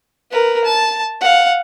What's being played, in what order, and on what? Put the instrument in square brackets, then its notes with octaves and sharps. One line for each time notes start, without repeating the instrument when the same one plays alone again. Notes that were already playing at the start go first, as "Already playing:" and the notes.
[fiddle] A#4 B4
A5
F5 F#5